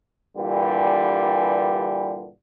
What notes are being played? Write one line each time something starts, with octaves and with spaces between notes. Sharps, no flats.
G2 A#2 D3 E3 G3